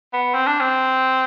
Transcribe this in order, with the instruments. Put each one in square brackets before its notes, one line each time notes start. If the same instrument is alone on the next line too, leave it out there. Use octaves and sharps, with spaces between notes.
[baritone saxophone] B3
C4
D4
C4